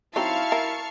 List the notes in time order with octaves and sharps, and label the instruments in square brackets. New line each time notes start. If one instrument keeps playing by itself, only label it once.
[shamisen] F#3 C4 D#4 [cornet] E4 [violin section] F5 C#6 [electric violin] A5
[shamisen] A#4 E5